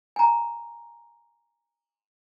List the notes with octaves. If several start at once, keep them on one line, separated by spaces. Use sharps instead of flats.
G#5 A#5